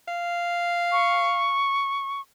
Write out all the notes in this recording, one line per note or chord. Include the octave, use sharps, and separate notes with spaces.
F5
C#6